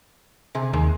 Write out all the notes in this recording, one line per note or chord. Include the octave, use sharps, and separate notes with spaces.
C3 G#4
D#2 G#3